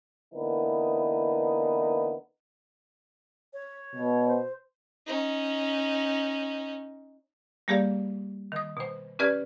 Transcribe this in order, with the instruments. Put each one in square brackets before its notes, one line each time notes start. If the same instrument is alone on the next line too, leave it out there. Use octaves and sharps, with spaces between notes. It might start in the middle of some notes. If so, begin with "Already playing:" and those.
[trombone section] D3 E3 A#3 B3 D#4 E4
[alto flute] C#5
[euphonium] B2
[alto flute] C5
[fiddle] C#4 D#4
[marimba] G3 A#3 G4 G#4 D5 F5
D#3 D#6
B2 C5
C#4 G4 B4 D5 F6 G#6